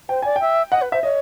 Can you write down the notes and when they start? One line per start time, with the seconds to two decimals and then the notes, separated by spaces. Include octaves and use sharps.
0.09 C5 G5
0.22 D5 G#5
0.36 E5 G5
0.72 D#5 F#5
0.82 B4
0.92 C5 E5
1.03 C#5 D#5